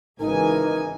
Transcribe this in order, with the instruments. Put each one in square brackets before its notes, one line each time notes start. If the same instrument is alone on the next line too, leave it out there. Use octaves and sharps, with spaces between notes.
[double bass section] G#1 C#3 E3 [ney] D#4 [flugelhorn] A#4 [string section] G#5